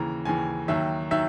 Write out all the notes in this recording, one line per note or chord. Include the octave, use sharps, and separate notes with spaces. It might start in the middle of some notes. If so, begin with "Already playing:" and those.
Already playing: D#2 C#3 E3 A#5
D#2 C#3 E3 G#5
D#2 D#3 F#3 E5
D#3 F#3 E5